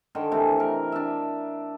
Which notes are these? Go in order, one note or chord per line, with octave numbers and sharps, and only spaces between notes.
D3 D#3 C5
C3 E3 A3
A#4
D4 E5